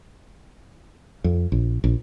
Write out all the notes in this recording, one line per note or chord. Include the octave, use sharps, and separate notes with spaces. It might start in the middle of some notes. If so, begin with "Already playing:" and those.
F2
A#1
A#1